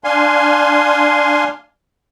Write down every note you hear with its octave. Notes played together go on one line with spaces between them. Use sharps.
D4 F5 G#5 C6